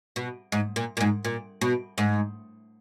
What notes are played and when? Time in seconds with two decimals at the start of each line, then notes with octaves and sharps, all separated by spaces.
0.16 B2
0.52 G#2
0.76 A#2
0.97 A#2
1.01 G#2
1.25 A#2
1.61 B2
1.98 G#2